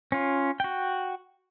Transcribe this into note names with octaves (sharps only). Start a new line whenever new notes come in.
C#4 F4
F#4 G5